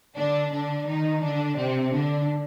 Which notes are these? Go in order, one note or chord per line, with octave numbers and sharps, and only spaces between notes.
D3 D4
D3 D4
D#3 D#4
D3 D4
C3 C4
D3 D4